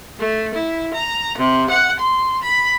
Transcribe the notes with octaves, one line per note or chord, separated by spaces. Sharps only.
A3
E4
A#5
C3
F#5
C6
B5